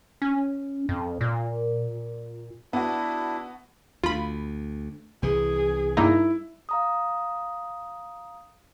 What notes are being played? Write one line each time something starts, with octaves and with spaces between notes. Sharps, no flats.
C#4
F2
A#2
B3 D4 E4 F#4
D2 F4 B5
C2 E3 G#4
G2 A#3 D#4 E4
F5 A#5 D#6